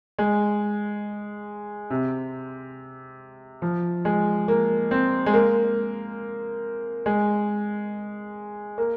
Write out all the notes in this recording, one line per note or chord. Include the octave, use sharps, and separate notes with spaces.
G#3
C3
F3
G#3
A#3
C4
G#3
A#3
G#3
A#3